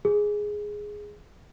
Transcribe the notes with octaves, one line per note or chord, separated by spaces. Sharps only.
G#4